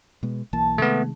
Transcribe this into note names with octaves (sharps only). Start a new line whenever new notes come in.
B2 G#3 B3
B1 E3 A#3 A5
C3 D#3 G#3 A3 B3